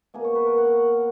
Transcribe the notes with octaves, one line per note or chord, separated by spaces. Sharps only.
B2 A#3 G#4
C#5
B4
A#4
F#5